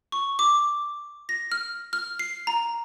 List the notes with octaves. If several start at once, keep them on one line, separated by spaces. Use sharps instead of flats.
C#6
D6
A#6
F6
F6
C7
A#5